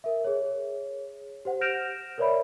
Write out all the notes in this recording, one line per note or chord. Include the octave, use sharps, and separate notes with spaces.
A#4 E5
G#4 C#5
G4 C5 F#5
F6 G6 A#6 D7 E7 F7
A#4 B4 C#5 D5 E5 B5